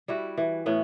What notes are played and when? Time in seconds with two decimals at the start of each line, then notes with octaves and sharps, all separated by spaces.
0.08 G3 E4 F#4
0.38 E3
0.66 A2 B3 C#4